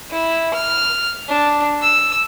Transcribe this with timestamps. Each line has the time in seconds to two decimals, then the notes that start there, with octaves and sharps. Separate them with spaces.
0.10 E4
0.54 F6
1.28 D4
1.82 E6